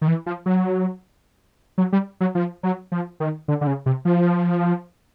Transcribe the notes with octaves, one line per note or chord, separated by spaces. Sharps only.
D#3
E3
F3
F#3
F#3
G3
F#3
F3
F#3
F3
D#3
D3
D3
C#3
C3
F3